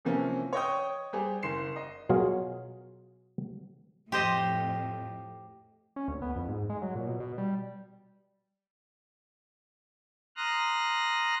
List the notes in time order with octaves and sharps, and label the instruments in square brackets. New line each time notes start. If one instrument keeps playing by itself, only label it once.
[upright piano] C3 E3 F3 A#3 C4 C#4
C#5 D#5 G5 D#6
G3 G4 G#4 C5
F#1 C6 C7 E7
D#5
[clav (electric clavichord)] B2 F#3 F4 G#4 A#4
[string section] F2 A2 [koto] G4 C5 D#5
[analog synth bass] C#4
D2
B3
F2
G#2
G#3
F#3
A#2
B2
B2
G3
[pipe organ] A#5 C6 D#6 F6 F#6 A#6